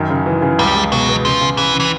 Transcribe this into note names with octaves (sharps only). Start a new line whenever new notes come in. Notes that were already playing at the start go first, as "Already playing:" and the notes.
Already playing: F#2 D#3
C#3
E3
C#3
C#2 G3
G#3
B2 F#3
B3
C#3 F3
C#3
C#3 E3
C#3
E3